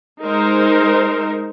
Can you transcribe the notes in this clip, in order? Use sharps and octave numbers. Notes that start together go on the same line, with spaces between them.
G#3 D#4 A#4 C5